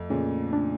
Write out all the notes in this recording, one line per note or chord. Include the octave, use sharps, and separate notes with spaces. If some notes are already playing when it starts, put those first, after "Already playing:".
Already playing: F2 A3
A#2 C#3
D4